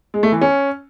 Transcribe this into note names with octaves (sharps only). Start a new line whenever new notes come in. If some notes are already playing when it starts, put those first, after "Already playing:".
G#3
A3
E3
C#4